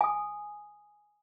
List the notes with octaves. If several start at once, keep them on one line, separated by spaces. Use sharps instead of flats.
G#5 D#6